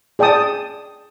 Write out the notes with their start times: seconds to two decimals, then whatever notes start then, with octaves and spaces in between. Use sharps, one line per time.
0.19 G#4 D5 G5 A5 D#6